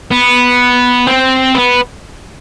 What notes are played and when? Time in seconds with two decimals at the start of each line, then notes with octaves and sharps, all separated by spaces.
0.12 B3
1.07 C4
1.55 B3